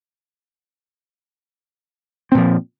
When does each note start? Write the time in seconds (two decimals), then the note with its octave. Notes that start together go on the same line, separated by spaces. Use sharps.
2.32 C4
2.35 A#2
2.38 F3